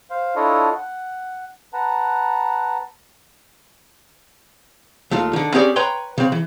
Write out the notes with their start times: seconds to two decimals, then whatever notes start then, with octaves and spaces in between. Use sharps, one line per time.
0.10 C5 F5
0.36 D4 E4 F4 A4 C#5 D#5
0.76 F#5
1.73 B4 F#5 A5 A#5
5.11 D#2 A3 F4
5.33 D3 D#3
5.54 C4 C#4 G4 G#4 C#5 D5
5.76 B4 C#5 G5 A#5 C6
6.18 C#3 C4
6.32 E3